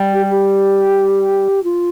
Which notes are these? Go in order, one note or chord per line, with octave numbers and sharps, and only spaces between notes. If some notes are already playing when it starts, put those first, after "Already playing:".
Already playing: G3
G4
G4
F4